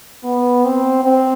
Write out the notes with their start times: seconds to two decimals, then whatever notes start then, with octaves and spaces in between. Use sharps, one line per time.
0.24 B3
0.65 C4
1.04 C4